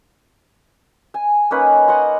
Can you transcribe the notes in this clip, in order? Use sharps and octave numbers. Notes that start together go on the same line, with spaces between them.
G#5
A#3 C#4 D#4 B4
C#5 D#5 F#5 C6